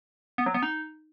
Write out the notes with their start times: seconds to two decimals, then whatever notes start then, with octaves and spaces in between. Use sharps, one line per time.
0.38 B3
0.46 F#3
0.54 B3
0.63 D#4